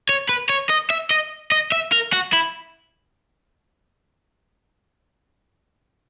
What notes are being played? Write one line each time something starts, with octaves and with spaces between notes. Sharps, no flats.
C#5
B4
C#5
D#5
E5
D#5
D#5
E5
A#4
F#4
E4